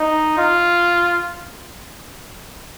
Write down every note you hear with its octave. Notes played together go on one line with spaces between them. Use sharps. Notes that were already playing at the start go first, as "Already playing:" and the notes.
Already playing: D#4
F4